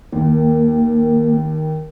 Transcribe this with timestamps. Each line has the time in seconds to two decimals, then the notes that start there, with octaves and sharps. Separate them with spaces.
0.12 D#2 A#3